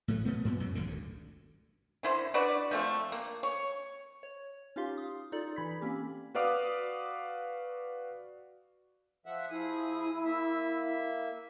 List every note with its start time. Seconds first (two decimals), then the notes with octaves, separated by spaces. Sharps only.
0.08 A2 F#3 A3
0.25 B2 A3 B3
0.45 G2 A#2 B3
0.60 F#2 B2 F#3
0.75 G#1 A#2 D3
0.87 D2
2.03 D3 E4 C5
2.34 D4 F#4 B4 D5
2.71 F3 A3 C4
3.12 A#3
3.43 C#5
4.23 C#5
4.76 C#4 D#4 F4 G4 F5 C6
4.97 D#6
5.32 D#4 F4 A4 D5
5.56 E3 B5 G#6 B6
5.81 A#3 C4 C#4 G4
6.35 F#4 B4 D5 F5 D6 D#6
9.26 F3 E5 F#5
9.50 F3 E4 G#4 D#6
10.25 A#3 E5